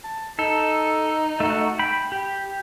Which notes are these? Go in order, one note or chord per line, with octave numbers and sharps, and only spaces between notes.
A5
D#4 A4
A3 F#4
G5 B5
G4